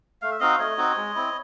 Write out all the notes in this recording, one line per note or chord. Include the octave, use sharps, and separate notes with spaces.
A3 F5
E5
C4 D#4 F#4 D#5 F5
A3 C#5 D#5
C4 D#4 F#4
G#3
C4 E4